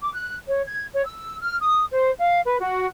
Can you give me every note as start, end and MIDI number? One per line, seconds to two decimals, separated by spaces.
0.01 0.12 86
0.14 0.36 90
0.48 0.62 73
0.67 0.87 92
0.92 1.05 73
1.05 1.38 88
1.42 1.57 89
1.61 1.85 87
1.91 2.11 72
2.19 2.41 77
2.46 2.56 71
2.60 2.86 66